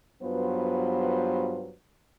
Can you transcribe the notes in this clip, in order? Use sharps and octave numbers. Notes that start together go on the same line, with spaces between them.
G2 F#3 B3 F4 B4 C5